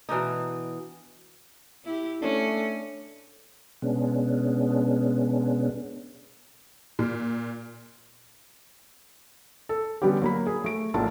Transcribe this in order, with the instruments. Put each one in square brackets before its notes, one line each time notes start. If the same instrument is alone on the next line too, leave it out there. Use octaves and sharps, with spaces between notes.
[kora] B2 E3 D4 D#4
[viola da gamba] E4 G4
[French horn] A3 [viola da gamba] C#4 [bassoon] D4
[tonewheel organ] B2 G#3 B3 C#4 D4
[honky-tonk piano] A#2
[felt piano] A4
D3 G3 B3 C#4 G4
F#3 A#3 B5
G#4
A3 D7
A#1 A2 A#3 F4 A5